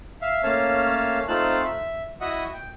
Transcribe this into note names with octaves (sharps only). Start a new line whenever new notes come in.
E5 F5
A3 A#3 C#4 C#5 F5 A5
A3 C4 D#4 F4 A5 F#6
E5
E4 F#4 D#5 E5 F#5 D#6
G5